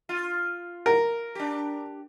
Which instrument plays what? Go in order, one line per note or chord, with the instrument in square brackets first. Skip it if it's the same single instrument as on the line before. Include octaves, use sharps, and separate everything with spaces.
[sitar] F4
[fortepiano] A#4
[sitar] D4 G4